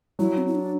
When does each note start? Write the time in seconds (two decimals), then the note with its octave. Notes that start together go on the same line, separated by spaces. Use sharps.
0.19 F#3 E4
0.38 C4
0.47 E4
0.55 D4